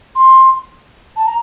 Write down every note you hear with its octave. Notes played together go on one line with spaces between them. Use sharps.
C6
A5
A#5